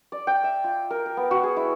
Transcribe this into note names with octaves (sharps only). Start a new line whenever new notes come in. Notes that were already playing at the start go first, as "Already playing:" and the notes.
D5
G5
E5
F4
A#4
A#4
B3
F#4
G#4
E4